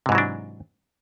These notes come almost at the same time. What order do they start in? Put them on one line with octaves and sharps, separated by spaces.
C3 G#2 E3 F#3 D4